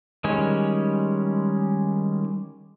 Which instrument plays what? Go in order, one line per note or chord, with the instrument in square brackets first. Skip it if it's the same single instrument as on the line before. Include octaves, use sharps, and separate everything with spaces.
[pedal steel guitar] D#3 G3 G#3 C#4